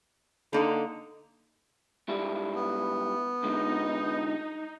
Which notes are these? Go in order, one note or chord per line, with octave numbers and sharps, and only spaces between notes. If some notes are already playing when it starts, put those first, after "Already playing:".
D3 A#3 D#4
G#2 G3 E4
B3
G#2 D3 G#3 D#4